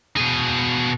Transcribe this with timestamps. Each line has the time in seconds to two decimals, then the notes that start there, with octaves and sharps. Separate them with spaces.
0.16 B2 G#4